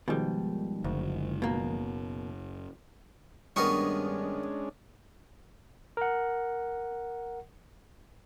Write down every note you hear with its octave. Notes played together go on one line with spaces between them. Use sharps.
B2 D#3 F3 G3 G#3
F#1 D2
B2 A#3
G2 D#3 G#3 B3 C#4 D4 A#4 C#6
A#4 F#5